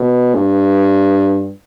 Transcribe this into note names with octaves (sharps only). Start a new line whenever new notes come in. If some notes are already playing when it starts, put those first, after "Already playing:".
Already playing: B2
G2